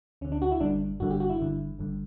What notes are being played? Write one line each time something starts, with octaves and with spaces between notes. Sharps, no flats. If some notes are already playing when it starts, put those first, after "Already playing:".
D2 D3 C#4
D4
F#4
E4
G1 G2 D3 D4
G1 G2 D3 F#4
G4
F#4
E4
G1 G2 D3
G1 G2 D3